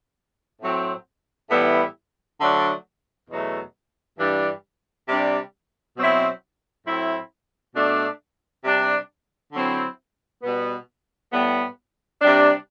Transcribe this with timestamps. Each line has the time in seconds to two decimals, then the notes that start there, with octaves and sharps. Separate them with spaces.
0.61 A2 F#3 C4
1.50 A2 E3 G3 B3 E4
2.39 D3 F#3 A3 D4
3.29 E2 B2 F#3 A3
4.18 G2 E3 G3 D4
5.08 C3 G3 D4
5.97 B2 F#3 C4 E4
6.86 A2 F#3 C4 E4
7.75 B2 A3 D4
8.64 C3 G3 D4
9.53 D3 F#3 C4 E4
10.42 B2 G3 B3
11.32 A2 G3 B3
12.21 C3 G3 D4